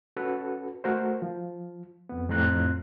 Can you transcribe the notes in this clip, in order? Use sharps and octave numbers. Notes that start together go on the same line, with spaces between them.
C#4 F#4 A4 B4
A3 F#4 A#4 C5
F3
F2 B3
F2 A2 A#5 C6 F#6